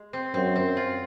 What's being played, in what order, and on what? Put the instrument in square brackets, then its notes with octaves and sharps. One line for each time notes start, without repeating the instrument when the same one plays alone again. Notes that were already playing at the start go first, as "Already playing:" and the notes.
Already playing: [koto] G#3
C4
[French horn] F#2 [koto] C4
[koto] C4
F4